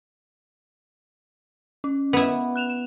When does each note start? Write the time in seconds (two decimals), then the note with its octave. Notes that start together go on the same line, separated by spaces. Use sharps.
1.84 C#4
2.13 B3 E4
2.56 F#6 E7 F7
2.70 E7